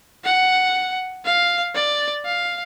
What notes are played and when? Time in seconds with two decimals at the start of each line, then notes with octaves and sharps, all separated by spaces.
0.25 F#5
1.25 F5
1.75 D5
2.25 F5